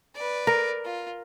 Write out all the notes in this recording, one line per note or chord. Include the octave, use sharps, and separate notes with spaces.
B4 D5
A#4
F4